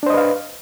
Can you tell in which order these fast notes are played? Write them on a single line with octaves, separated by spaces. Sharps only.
D4 C5 D#5 B4 F5